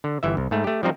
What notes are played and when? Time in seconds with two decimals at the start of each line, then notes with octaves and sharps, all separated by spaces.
0.04 D3
0.23 G1 E3 E5
0.37 C2
0.51 G#2 A3
0.64 A3 G4
0.83 F3 G3 C4 D#4